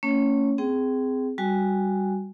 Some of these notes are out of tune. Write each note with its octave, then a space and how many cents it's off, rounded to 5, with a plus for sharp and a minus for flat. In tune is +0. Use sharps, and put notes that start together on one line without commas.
A3 +40 C#4 +0 C#5 +0
C4 -20 G#4 +0 G5 -25
G3 +0 F#4 +0 G#5 +0